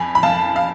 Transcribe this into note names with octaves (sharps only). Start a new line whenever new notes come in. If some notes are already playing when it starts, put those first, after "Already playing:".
Already playing: F2 G#5 B5
B5
F2 F5 A5
F5